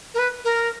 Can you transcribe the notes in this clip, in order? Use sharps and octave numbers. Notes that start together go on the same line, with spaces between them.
A#4
B4
A#4